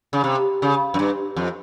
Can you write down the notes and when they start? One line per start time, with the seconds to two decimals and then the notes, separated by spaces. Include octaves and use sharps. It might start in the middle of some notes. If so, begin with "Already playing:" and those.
0.13 C#3
0.24 C3
0.62 C#3
0.94 F#2
0.99 G2
1.36 F2